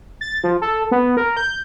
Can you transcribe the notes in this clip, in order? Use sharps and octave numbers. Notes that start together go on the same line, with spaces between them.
A6
F3
A4
B3
A#4
G6